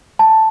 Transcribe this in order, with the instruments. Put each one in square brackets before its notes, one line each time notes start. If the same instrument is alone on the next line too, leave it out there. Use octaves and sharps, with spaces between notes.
[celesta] A5